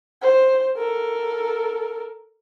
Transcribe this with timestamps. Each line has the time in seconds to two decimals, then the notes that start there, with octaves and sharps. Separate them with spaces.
0.22 C5
0.77 A4 A#4